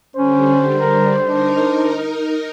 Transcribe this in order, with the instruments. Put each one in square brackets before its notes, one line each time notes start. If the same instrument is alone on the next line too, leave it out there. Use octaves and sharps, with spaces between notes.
[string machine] D3 G3 [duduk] C#4 [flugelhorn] C5
[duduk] A#4
[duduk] D4 [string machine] D#4 A#4